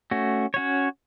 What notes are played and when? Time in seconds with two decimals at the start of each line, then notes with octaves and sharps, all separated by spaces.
0.11 A3 C#4 F#4
0.54 C#4 F#4 C#5